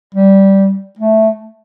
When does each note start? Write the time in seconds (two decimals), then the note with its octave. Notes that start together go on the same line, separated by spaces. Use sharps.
0.15 G3
0.99 A3